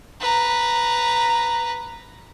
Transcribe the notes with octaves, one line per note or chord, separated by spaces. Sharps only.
B4 A#5